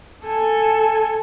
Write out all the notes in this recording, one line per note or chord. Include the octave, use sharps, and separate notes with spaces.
A4 G#5